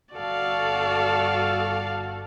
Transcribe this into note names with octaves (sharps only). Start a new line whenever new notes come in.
G1 F#4 A4 D5 F5